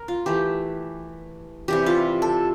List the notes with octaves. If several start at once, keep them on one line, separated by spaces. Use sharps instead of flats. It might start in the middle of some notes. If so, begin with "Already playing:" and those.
Already playing: A#4
F4
E3 A3 G4
C3 E3 G3 G4
F4
A4